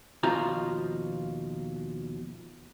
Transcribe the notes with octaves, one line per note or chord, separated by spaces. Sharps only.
D#2 B2 F3 F4 A#5